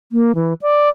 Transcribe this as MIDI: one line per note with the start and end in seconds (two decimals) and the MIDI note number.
0.12 0.32 58
0.35 0.53 52
0.61 0.89 74